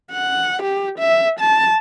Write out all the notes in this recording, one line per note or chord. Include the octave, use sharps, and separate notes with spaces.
F#5
G4
E5
A5